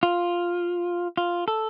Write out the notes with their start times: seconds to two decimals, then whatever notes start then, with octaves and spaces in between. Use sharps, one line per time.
0.03 F4
1.17 F4
1.48 A4